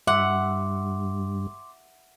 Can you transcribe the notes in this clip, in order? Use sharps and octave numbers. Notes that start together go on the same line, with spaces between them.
G2 E5 F#5 C6 D6